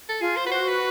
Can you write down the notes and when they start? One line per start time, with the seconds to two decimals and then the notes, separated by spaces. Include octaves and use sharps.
0.09 A4
0.20 F4 G#4
0.37 C5
0.45 F#4 B4
0.52 C5
0.68 B4